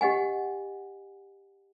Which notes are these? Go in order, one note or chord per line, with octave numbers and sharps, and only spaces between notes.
G4 D#5 F#5 G#5